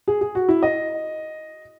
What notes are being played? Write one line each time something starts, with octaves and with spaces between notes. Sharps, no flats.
G#4
G#4
F#4
E4
D#5